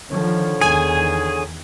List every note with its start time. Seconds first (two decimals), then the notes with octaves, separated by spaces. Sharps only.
0.11 D3 D#3 F3 C#5
0.61 E2 D#3 G#4 G#5